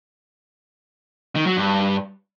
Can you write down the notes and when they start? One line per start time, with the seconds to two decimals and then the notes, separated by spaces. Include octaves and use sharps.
1.36 D#3
1.46 F#3
1.57 G2